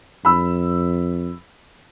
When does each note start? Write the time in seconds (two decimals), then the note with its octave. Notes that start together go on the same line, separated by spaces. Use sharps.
0.25 F2 B5 E6